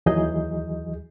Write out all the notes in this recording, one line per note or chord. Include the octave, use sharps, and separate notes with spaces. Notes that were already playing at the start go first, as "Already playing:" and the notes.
D#2 E3 F#3 G#4 D#5 G6